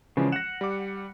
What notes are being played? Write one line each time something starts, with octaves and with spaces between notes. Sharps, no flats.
C#3 E3 F3 G#3
F#5 A#6 E7
G3 D6